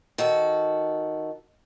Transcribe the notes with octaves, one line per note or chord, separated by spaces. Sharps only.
D#3 F#4 A4